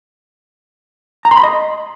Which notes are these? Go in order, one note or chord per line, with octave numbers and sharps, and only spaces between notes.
A#5
C6
B5
D#5